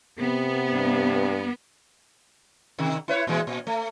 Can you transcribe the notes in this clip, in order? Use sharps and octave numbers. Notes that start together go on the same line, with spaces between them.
C3 B3
G2
C3 D#3
E4 B4 C#5
A#2 E3 G#3
A#2
A3